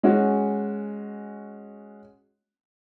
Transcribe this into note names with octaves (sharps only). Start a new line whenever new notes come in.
G#3 C#4 F#4